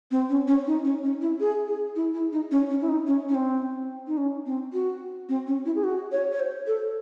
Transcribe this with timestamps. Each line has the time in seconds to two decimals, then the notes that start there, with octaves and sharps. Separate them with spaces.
0.11 C4
0.29 C#4
0.48 C#4
0.67 D#4
0.85 C#4
1.03 C#4
1.21 E4
1.40 G#4
1.68 G#4
1.96 E4
2.14 E4
2.32 D#4
2.51 C#4
2.70 C#4
2.82 E4
2.89 D#4
3.07 C#4
3.29 C#4
3.35 C4
4.07 D#4
4.17 C#4
4.46 C4
4.73 F#4
5.29 C4
5.47 C#4
5.66 E4
5.75 G#4
5.84 F#4
6.12 C#5
6.32 C#5
6.40 C5
6.67 A4